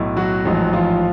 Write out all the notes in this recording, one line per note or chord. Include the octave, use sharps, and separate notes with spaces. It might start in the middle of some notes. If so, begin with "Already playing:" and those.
Already playing: B1 A2
F#3 F#4
A1 G#2 F3
F3 F4